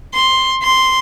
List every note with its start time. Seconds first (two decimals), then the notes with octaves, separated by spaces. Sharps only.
0.14 C6
0.63 C6